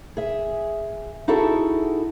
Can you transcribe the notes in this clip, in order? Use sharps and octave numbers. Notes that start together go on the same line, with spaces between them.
G#4 E5
D#4 E4 F#4 G#4 A4